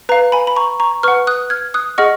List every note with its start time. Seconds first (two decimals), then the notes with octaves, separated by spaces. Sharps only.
0.09 B4 F5 A#5
0.32 G#5 B5
0.47 B5
0.56 A#5 C#6
0.80 A#5 C#6
1.03 B4 C#6 F6
1.08 F#5
1.27 D#6 F#6
1.50 F6 G#6
1.74 D#6 F#6
1.98 G#4 D#5 F#5 C#6 F6